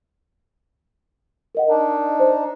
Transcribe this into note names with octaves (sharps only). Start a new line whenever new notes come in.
A#4 D#5 F#5
D4 D#4
C5